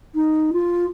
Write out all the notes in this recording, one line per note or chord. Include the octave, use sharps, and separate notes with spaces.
D#4
F4